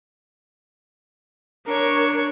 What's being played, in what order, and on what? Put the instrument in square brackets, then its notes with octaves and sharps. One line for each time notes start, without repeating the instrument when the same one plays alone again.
[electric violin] D4 C#6 [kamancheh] A#4 C#5